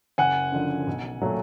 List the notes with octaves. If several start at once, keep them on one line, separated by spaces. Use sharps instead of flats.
F#1 F#5 G#5
F#2 D3 F3
B1
A#2 F#3 A3